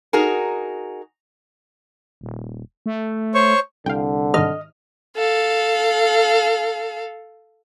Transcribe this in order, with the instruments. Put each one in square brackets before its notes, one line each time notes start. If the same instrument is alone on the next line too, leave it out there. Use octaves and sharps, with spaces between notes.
[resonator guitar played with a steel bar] D#4 F#4 G#4 A#4
[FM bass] D#1
A3
[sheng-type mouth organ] C5 C#5 C#6
[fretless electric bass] C2 [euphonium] D3 [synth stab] F5 G5
[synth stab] G#2 D#3 F6 [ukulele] D#5
[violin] A4 F5